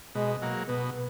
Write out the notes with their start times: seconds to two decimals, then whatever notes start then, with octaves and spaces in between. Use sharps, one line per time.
0.15 B2 G#3
0.42 F#3 A#3
0.68 B2 B3